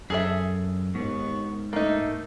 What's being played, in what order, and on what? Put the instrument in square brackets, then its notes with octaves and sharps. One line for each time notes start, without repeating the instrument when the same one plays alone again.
[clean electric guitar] F#2 [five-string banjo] G#4 A4 E5
[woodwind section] D#2 B3 C#6 [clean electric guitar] G#2
[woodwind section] A3 [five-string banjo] A#3 D#4